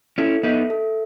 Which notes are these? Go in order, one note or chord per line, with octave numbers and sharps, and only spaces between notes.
C#4 E4 A4
B3 D#4 E5
A4